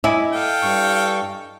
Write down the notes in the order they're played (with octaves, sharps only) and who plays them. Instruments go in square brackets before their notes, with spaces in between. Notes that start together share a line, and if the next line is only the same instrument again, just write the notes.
[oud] E4 [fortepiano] D#5 G#5 D6
[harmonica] A4 F5 G5
[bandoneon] G2 C#6